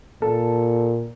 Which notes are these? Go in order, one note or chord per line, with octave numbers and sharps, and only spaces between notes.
A#2 A4